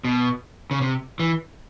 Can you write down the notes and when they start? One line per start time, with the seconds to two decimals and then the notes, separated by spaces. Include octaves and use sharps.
0.05 B2
0.71 C#3
0.81 C3
1.20 E3